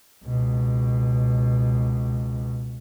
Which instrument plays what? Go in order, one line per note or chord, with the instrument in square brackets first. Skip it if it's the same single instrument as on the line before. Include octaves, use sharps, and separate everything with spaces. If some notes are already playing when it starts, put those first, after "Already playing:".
[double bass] C#2 B2